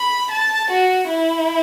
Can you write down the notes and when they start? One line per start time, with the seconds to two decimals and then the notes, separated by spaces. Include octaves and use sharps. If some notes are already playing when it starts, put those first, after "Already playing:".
Already playing: B5
0.31 A5
0.71 F#4
1.10 E4